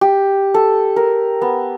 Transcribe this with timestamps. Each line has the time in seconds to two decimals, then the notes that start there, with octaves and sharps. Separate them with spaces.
0.01 G4
0.54 A4
0.96 A#4
1.41 B3